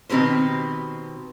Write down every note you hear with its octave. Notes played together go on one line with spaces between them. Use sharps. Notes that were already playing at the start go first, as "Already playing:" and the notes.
B2 D#3 C4 G4 B4 C5